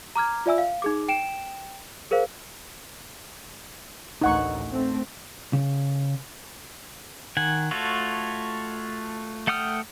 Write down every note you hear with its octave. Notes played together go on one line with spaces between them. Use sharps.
A#5 D6 F6 G#6
F4 D5 E5 G#5 E6
F5
D#4 G#4 D6
G5 D7 E7
G#4 A#4 C5 F5
A1 D2 D#4 F#5 C#6
A3 C4
C#3
D#3 F#5 G#5
A3 F4 F#4 A4 C#5
A3 F#5 G5 D#6 F6